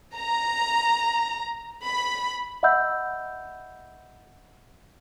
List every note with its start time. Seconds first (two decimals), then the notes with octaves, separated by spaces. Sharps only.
0.16 A#5
1.83 B5
2.63 D#5 E5 F#5 B5 E6 G6